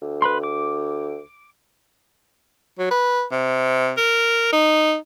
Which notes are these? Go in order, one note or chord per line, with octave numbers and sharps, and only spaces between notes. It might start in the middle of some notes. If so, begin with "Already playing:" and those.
D2
B4 B5 C6
D6
F#3
B4
C3
A#4
D#4